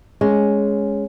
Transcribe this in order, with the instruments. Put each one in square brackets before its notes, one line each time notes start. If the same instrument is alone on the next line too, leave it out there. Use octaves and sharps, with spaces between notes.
[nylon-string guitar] G#3 C#4